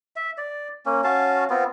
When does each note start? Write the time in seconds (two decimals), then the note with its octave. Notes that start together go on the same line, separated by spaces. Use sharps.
0.16 E5
0.38 D5
0.86 A#3 C#4
1.04 C#4 F#4 F5 A5
1.50 B3 C4 F4